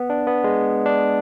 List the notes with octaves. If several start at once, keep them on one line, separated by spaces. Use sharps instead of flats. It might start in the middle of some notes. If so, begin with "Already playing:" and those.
Already playing: B3
D4
B3
G#3
D4